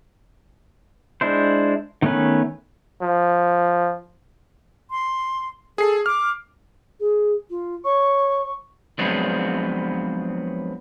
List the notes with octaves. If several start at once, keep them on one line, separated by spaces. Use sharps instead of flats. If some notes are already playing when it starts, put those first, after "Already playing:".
G#3 D4 E4 C5
D#3 A3 B3 C#4 B4
F3
C6
G#4 A4 C7
D6 F6
G#4
F4
C#5 C#6
F3 F#3 G#3 B3 C4 D4